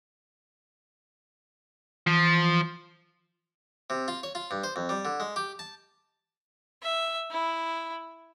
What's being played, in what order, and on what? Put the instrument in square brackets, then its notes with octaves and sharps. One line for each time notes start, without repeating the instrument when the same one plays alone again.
[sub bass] E3 [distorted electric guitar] F3
[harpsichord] C3
F4
C#5
F4
G2
C5
F2
G3
D3
G#3
G4
A5
[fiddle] E5
E4